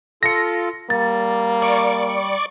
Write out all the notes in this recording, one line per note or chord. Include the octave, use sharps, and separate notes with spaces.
F4 A4 A#6 C#7
G3 A#3 A6
D5 C#6 D6